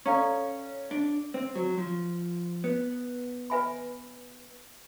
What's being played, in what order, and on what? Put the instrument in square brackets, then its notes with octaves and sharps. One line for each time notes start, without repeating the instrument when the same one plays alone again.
[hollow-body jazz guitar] C#4 [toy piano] A4 D5 F5 A#5 C#6
[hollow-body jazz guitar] D4
C4
F#3
F3
B3
[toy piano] B4 E5 G#5 B5